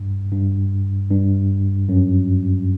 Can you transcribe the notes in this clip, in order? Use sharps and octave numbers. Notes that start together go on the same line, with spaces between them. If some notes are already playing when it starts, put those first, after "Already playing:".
Already playing: G2
G2
G2
F#2